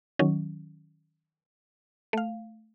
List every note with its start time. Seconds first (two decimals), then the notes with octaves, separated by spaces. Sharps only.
0.19 D#3 F#3 C#4
2.13 A3 F5